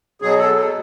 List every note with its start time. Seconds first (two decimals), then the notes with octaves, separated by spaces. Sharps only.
0.22 B2 F#3 G#4
0.38 A4
0.56 A4